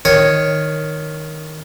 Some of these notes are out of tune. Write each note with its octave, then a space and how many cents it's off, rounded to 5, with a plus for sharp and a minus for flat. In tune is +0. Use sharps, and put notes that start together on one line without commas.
D#3 +0 C#5 +0